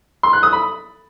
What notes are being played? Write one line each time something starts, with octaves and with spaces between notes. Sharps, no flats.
C6
F#6
D#6
B5